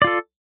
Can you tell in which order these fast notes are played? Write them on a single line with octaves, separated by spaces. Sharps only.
D5 F4 A4